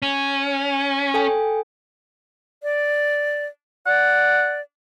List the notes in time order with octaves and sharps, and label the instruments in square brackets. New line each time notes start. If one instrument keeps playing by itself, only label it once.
[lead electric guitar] C#4
[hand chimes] A4 G5 G#5
[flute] D5
[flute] D5 [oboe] F#5